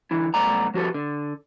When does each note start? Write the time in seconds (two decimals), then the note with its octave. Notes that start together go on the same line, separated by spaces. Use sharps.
0.11 D3 E3 E4
0.34 C2 F#2 A3 B3 D5 A#5
0.74 F3 F#4 G4 A4 B4
0.94 D3